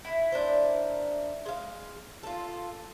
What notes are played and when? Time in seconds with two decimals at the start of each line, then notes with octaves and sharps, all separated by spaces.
0.05 E4
0.32 D4 A#4 C5
1.45 G#3 F5
2.23 F4 A4